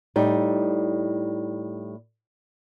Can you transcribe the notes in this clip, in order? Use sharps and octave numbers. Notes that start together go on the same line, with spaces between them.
A2 G3 D#4